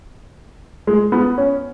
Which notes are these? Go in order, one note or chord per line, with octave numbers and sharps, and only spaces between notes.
G#3
B3
C#4